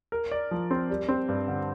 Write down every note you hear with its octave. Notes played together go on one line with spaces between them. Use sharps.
A#4
D5
F3
C4
G3
C4
G2
D3